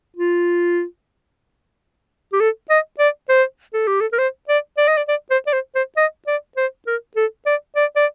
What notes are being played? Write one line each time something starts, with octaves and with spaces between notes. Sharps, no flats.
F4
G4
A4
D#5
D5
C5
A4
G4
A4
A#4
C5
D5
D5
D#5
D5
D5
C5
D5
C5
C5
D#5
D5
C5
A#4
A4
D5
D5
D5